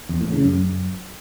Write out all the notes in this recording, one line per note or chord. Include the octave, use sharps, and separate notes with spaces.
E2
A2
C#3
F#2